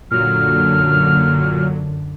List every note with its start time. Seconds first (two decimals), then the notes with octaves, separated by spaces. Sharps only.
0.11 F#2 A#2 D3 F#3 F6